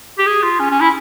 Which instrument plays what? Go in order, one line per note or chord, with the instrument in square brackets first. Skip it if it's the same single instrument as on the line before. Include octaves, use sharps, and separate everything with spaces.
[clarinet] G4
G#4
F4
C#4
C#4
E4